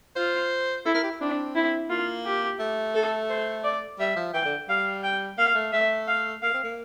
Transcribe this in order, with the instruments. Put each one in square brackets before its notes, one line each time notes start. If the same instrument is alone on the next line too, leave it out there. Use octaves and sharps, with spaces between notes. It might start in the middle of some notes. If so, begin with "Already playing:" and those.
[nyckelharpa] F4 [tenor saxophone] C5
[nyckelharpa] E4 [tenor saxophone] A4
[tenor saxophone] A#4
G4
E4
[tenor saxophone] C4 [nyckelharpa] D4
[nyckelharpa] E4
[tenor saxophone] A#3 [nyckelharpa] F4
[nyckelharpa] G4
[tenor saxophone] A3
[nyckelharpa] A4
C5
D5
[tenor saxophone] G3 [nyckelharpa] E5
[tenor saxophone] F3
[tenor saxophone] E3 [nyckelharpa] G5
[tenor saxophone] D3
[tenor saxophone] G3 [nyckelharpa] F5
[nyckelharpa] G5
[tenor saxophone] A#3 [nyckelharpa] F5
[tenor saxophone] A3
[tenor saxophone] A3 [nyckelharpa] E5
[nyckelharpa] F5
[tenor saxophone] A#3 [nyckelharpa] F5
[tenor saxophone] C4
A#3